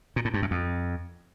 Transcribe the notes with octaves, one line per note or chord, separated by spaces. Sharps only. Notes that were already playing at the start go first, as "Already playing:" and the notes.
A#2
A2
G2
F#2
F2